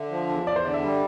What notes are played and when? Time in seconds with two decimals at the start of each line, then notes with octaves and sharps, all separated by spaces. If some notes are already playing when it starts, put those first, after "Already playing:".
Already playing: D3 E5
0.10 F3
0.29 E2
0.46 E2 D5
0.56 C5
0.64 D3 D5
0.74 E5
0.82 G3